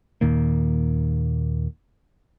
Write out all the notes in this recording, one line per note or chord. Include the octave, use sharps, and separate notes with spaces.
D#2 A#2 D#3 A#3